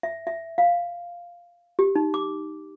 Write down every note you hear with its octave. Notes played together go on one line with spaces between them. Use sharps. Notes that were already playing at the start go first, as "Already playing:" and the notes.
E5
E5
F5
G4
D#4
D6